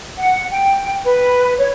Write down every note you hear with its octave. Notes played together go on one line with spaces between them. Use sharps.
F#5
G5
B4
C#5